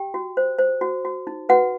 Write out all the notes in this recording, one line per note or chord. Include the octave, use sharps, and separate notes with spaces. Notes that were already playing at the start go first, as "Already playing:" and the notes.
Already playing: G4 G5
F#4
C5
C5
F#4
F#4
D#4
F#4 B4 F#5